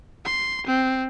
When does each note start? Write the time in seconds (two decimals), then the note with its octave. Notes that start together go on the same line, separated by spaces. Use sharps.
0.25 C6
0.67 C4